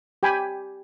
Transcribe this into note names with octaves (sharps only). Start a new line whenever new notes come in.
G4 G5 G#5 B5